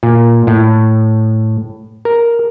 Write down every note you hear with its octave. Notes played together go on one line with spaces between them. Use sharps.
A#2
A2
A#4